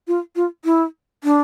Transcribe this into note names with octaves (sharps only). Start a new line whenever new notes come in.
F4
F4
E4
D4